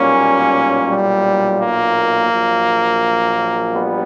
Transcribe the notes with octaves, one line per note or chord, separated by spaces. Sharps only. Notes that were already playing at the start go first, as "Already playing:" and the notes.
Already playing: B1 A#2 G3 A#3 C#4
G3
A#3
A#1 A#2 F#3
G3 B3